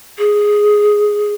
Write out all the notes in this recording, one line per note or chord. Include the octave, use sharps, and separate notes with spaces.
G#4